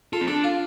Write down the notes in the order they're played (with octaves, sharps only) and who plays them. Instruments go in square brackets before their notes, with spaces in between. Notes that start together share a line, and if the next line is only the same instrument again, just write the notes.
[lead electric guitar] F4 [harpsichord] A4
[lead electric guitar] C4
[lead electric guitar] D4 [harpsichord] A4
[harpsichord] F4